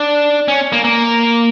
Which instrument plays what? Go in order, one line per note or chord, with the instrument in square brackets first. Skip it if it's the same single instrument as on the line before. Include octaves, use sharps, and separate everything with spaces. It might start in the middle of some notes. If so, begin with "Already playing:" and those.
Already playing: [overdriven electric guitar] D4
C#4
A#3
A#3